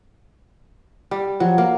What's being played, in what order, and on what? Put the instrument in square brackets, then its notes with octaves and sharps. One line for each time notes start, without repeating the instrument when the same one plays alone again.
[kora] G3
[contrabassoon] F3 [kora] F#3
[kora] A#3